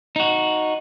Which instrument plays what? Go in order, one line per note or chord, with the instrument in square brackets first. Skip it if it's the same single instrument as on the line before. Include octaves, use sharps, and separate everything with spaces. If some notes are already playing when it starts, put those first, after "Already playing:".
[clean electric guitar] D#4 F#4